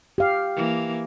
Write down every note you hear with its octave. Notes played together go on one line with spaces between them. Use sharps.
G4 F5
E3 A#3